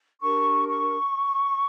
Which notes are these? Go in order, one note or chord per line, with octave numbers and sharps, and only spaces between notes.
D4 G4 A#4 C#6
C#6